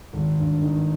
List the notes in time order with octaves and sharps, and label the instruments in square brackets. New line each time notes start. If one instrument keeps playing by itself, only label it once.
[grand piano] G#1
G2
D#3